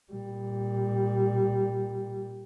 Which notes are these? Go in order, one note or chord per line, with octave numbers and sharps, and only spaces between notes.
A#2 G3